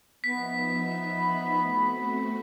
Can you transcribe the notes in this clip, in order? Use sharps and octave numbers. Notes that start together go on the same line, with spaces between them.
F3 B3 D#4 E5 B6
B3
B5
A3 C4 F#4